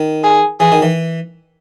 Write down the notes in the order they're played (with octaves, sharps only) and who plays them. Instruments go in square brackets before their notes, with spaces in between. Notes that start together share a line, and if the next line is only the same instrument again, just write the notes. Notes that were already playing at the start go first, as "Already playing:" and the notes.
Already playing: [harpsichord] D#3
[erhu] G#4
[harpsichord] E3 [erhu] G#4
[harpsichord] D#3
E3